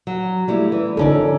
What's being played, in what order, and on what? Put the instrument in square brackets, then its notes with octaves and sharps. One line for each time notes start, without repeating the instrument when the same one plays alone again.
[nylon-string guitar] F#3
G3 A3 E4
E3
[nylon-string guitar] F2 C#4 D5 [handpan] D3 D#4 A4